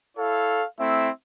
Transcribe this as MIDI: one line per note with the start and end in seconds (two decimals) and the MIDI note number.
0.18 0.65 64
0.18 0.65 69
0.18 0.65 73
0.18 0.65 77
0.80 1.10 57
0.80 1.10 60
0.80 1.10 64
0.80 1.10 76